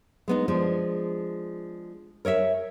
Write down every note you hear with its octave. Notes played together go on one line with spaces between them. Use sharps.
G#3 B3 D#4
F3 G#3 D4
A#4 C#5 D#5 E5